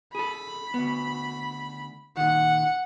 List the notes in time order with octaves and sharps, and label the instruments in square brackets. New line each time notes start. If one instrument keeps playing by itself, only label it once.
[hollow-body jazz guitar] G#4 A4 [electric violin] B5
[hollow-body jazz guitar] D2 B3
[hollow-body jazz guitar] A#2 D#3 [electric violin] F#5